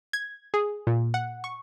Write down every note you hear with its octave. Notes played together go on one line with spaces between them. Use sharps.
G#6
G#4
A#2
F#5
C#6